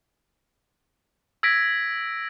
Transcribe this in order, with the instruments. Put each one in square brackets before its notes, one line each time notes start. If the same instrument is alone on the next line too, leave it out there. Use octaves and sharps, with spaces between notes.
[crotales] E6 G#6 A#6 B6 D7